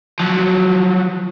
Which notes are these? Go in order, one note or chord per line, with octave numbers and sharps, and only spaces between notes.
F3 F#3